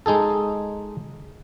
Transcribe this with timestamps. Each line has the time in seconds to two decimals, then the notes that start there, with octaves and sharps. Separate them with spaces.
0.06 G#3 D#4 G#4 A4